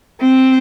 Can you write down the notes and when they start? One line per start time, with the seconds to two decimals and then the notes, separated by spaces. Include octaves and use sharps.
0.21 C4